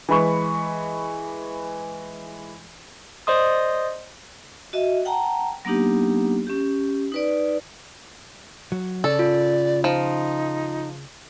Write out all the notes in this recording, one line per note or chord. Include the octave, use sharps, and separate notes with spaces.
E3 G#3 B5 C#6
C5 D5 D#5 C6 D#6
F#4 D#5 E5
F#5 G5 A5 A#5
F#3 A#3 B3 D4 D#4 G4
C#4 G4
D#4 B4 D5
F#3
C#3 A4 D5
F4
F3 D#4